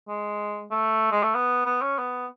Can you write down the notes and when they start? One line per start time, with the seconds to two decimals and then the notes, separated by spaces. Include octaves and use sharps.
0.09 G#3
0.71 A3
1.11 G#3
1.23 A3
1.35 B3
1.66 B3
1.82 C#4
1.98 B3